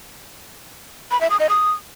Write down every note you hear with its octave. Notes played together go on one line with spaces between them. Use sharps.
B5
E5
D#6
D#5
D#6